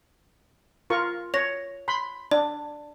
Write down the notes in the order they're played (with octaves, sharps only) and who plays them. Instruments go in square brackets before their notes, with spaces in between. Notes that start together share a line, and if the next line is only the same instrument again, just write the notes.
[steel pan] F4 A#4 C#6
[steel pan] C#5 [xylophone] A#6 F7
[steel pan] B5 C6
[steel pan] D4 [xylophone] D5